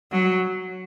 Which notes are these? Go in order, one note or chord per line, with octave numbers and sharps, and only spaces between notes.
F#3